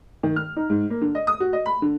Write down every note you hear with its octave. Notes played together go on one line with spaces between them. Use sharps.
D#3
F6
D#4
G#2
A#3
D3
D#5
D#6
F#4
D#5
B5
D3